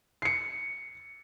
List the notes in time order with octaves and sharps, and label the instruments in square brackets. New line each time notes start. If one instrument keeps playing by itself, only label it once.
[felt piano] C7 C#7